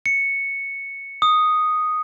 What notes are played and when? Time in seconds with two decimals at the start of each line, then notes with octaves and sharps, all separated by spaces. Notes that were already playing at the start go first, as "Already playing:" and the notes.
0.06 C#7
1.22 D#6